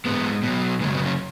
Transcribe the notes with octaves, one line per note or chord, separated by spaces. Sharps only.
G#2 G#3 B3
B2 F#3
F#2 C#3 F#3 G#3
B3
C#4